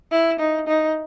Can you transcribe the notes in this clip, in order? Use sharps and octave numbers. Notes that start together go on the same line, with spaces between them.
E4
D#4
D#4